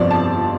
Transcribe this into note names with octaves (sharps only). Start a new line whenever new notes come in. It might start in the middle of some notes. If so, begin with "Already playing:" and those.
Already playing: G1 F2 C3 F3 C5 D5
A5